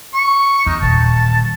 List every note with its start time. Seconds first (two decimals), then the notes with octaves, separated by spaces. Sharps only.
0.14 C#6
0.66 E2 D#4
0.82 D#1 A5